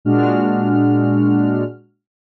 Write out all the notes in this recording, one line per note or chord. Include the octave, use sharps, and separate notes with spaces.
A#2 G#3 D4 F#4 F6